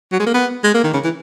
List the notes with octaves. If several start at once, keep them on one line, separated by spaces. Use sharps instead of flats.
F#3
G#3
A#3
B3
G#3
A#3
D#3
C#3
E3